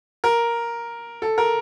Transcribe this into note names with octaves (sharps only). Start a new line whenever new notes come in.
A#4
A4
A#4